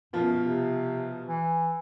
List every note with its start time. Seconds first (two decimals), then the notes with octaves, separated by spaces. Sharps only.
0.13 F#2 B2 F3 F4
0.44 C3
1.28 E3